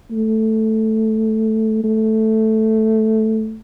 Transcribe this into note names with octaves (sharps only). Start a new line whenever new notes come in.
A3
A3